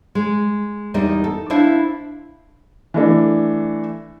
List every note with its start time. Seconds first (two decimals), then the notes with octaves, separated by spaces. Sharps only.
0.15 G#3
0.94 E2 G3 D#4 A#4
1.24 A4
1.50 D4 E4 C5 E5 F5
2.94 E3 A3 D4